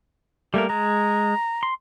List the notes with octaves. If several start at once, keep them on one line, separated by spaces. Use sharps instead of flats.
G3 A3 A#3 A#4
G#3 A#5
C6